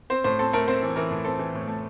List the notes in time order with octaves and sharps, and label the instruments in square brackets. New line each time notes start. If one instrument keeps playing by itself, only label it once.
[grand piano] C4 C5
A2 C5
C4 A4
A3 A#4
C4 C5
E3
E3 A#4
A2
C4 A4
E3
A2
A3